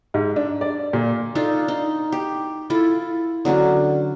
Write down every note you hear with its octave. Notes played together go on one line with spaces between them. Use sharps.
G#2
D4
D5
A#2
D4 D#4 F4 A4
D#4
G4
E4 F4 A4
D3 F#3 C#4 D4